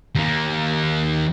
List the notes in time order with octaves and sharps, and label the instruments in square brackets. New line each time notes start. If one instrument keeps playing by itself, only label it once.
[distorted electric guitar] D#2 A#3